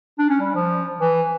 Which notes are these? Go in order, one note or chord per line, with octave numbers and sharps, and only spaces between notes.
D4
C#4
G3
F3
E3